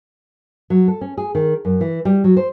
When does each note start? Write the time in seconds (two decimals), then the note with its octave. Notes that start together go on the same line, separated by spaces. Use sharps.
0.70 F#3
0.88 A4
1.01 C#4
1.17 G#4
1.35 D#3
1.65 F#2
1.81 E3
2.05 G3
2.24 F#3
2.37 C5